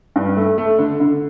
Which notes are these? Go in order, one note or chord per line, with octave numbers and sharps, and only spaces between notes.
G2
A3
A3
D3
D3